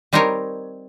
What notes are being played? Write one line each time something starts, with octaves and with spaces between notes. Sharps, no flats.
G3 C4 D#4 A#4 C#5